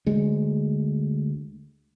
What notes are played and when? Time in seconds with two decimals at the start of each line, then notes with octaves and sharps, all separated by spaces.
0.06 D2 G#3